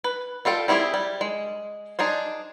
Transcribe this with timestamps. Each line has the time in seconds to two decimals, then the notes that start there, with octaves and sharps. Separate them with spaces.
0.04 B4
0.45 G3 F4 A4 G5
0.68 G3 C4 E4 G4 G#4
0.94 G3
1.21 G#3
1.99 D4 D#4 G#4 C5